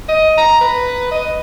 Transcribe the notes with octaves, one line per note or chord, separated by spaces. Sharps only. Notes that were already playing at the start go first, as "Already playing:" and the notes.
D#5
A#5
B4
D#5